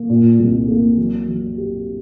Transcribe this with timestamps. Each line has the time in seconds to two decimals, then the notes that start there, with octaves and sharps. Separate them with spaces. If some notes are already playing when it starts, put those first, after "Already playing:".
Already playing: A#3
0.09 A#2
0.39 C2
0.68 A#3
0.97 F#3
1.28 F#3
1.57 G4